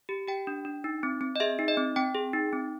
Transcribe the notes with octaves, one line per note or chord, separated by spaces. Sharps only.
G4
G4 G5
D4
D4
D#4
C4
C4
D#5
G#4 E5
D#4
D#5
C4
C4 G5
G#4
D#4
C4